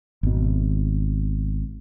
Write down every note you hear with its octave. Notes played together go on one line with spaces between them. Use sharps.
G#1 B2